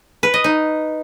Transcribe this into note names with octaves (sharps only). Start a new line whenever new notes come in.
B4
D#5
D#4